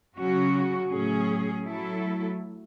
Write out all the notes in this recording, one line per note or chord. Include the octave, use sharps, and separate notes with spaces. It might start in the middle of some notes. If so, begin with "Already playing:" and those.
C#3 F#3 C#4 F#4
A2 F#3 C#4 G#4
F#3 A3 E4 A4